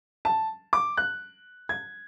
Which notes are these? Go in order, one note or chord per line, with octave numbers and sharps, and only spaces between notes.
A5
D6
F#6
G#6